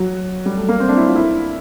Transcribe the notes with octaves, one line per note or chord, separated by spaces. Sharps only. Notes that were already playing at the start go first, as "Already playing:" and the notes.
Already playing: F#3
G3
A3
A#3
C4
D4
E4
F4
E4